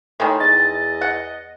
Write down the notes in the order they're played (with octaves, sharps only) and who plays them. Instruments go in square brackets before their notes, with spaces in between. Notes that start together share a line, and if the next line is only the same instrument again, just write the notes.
[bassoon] A2 [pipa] D#3 G3 G#3
[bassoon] E2 [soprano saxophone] D#5 [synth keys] A6
[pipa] F#5